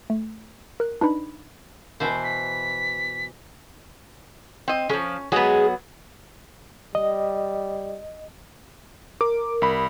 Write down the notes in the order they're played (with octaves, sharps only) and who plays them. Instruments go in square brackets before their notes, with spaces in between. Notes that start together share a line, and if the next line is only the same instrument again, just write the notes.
[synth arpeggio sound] A3
A#4 F#6
D4 D#4 B4 B5
[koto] B2 E3 C5
[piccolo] B6
[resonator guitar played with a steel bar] C4 D#5
[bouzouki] F3 G#3 [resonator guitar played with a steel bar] C#4
[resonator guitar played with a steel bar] F#3 B3 [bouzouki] G#3 G#4
[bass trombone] G3 [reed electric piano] D#5
[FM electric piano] A#4 [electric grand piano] D6
[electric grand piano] C2 B5